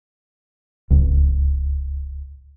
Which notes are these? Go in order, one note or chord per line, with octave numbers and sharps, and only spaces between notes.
D1 C#2